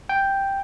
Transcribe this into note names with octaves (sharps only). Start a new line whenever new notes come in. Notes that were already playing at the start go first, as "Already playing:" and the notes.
G5